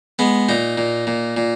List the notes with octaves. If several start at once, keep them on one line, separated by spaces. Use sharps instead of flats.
G#3 B3
A#2 D#4
A#2
A#2
A#2